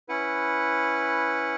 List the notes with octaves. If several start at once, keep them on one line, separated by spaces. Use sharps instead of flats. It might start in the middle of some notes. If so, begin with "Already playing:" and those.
C#4 E4 B4 F#5